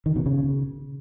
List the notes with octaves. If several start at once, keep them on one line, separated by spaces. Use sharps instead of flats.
D#3
B2
C#3